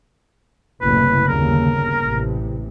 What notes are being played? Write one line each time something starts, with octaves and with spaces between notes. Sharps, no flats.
F#1 C2 A2 B4
G1 D#2 C#3 A#4
A1 C3